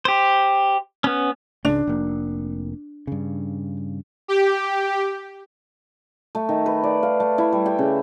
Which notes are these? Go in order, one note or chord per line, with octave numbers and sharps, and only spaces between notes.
G4 C5
B3 C#4
C#2 G#2 C#3 D4
F1 A#3
G2 C#3
G4
A3
D#3
B4
D5
F5
A3
E4
G3
G5
C#3